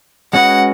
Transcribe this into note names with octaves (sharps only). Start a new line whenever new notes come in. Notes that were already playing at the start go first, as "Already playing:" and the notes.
G#3 C#4 F#4 B4 D#5 F#5